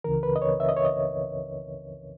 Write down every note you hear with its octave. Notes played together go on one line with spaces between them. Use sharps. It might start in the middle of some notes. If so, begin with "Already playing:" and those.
C#2 C#3 E3 A#4
B4
D#5
C#5
E5
D#5
C#5
D#5